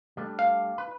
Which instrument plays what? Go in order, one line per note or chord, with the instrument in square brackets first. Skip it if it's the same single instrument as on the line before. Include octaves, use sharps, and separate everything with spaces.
[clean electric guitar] G3 A3 D4
[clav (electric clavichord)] F5
[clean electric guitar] B4